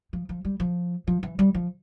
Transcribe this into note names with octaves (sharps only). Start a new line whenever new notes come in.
F3
F3
G3
F3
F3
E3
G3
F3